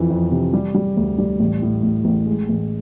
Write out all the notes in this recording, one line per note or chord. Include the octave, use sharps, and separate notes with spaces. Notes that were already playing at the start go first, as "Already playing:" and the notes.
Already playing: F2 E3
F2
C3
G3
G3
D2
G3
A1
A2
A1
A1
G#3
A1